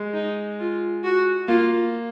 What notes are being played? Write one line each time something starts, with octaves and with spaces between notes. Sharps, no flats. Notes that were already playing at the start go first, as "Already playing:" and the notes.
Already playing: G#3
D#4
F4
F#4
A#3 F4